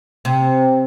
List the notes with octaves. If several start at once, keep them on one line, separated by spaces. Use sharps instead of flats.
C3